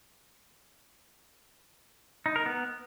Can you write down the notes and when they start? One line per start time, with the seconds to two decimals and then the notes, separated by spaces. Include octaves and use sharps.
2.26 D#4
2.36 A#4
2.46 B3